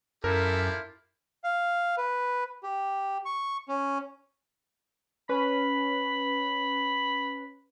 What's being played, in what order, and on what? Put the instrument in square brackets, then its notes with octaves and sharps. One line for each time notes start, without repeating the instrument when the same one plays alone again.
[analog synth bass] F#2 [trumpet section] E4 F4 G4 [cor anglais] A4 [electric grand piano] A#4
[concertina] F5
B4
G4
C#6
C#4
[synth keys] C#4 B4 [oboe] B5